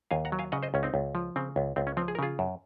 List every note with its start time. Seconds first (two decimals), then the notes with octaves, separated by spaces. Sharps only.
0.11 D#2 F5 G#5
0.25 F#5 A#5
0.32 F#3
0.39 F5 G#5
0.52 C#3 D#5 F#5
0.63 C5 D#5
0.74 C#2 C#4
0.83 C4 D#4
0.94 C#2
1.15 F3
1.36 C#3 C4
1.56 C#2
1.76 C#2 C4
1.87 C#4
1.97 F3 C4
2.08 G#4
2.15 A#4
2.19 C#3 F4 G#4
2.39 F#2